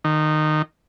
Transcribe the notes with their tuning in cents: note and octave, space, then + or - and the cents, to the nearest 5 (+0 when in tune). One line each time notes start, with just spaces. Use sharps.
D#3 -20